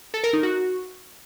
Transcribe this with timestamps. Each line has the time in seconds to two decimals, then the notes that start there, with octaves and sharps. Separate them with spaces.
0.14 A4
0.24 A#4
0.33 D#4
0.43 F#4